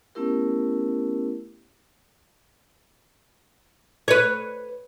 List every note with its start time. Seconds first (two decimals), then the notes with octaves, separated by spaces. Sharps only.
0.15 A3 B3 C#4 E4 G4 A#4
4.08 B4 C#5